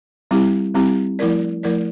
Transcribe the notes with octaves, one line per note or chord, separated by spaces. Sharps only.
G3 C4 E4 G4
G3 C4 E4 G4
F3 A3 E4 A#4 D5
F3 A3 E4 A#4 D5